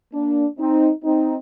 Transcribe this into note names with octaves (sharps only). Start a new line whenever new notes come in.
A#3 D4
C4 D#4
C4 D#4